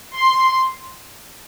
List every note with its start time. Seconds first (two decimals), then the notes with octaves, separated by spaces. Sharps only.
0.16 C6